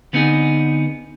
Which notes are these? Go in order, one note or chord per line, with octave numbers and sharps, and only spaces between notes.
D3 B3 C4 D#4 G#4